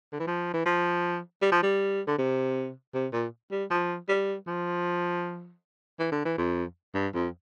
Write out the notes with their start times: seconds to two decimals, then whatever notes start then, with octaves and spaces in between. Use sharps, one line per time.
0.12 D3
0.19 E3
0.27 F3
0.54 E3
0.66 F3
1.42 G3
1.52 F3
1.63 G3
2.07 D3
2.18 C3
2.94 C3
3.13 A#2
3.51 G3
3.70 F3
4.08 G3
4.47 F3
5.99 E3
6.12 D3
6.25 E3
6.38 F2
6.94 G2
7.14 F2